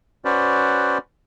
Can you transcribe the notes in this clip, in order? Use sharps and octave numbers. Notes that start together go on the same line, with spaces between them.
C#4 F#4 B4 C5 D5